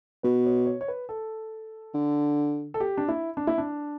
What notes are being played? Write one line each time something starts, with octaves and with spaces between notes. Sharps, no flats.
B2 B4
C#5
C#5
C#5
B4
A4
D3
A4
G4
D4
E4
D4
E4
D4